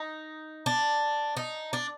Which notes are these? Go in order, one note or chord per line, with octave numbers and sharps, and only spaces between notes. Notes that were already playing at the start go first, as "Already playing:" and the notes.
Already playing: D#4
D4
D#4
D4